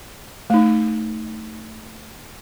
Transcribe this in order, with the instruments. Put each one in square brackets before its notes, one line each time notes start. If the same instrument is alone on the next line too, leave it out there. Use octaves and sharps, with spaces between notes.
[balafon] A3 D#4